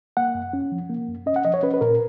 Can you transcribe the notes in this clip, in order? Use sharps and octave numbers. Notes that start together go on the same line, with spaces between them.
A#3 F#5
F#2
C#4
F3
A#3
F#2
C#4 D#5
F#5
F3 D#5
C#5
C#4 B4
B4
A#2 A#4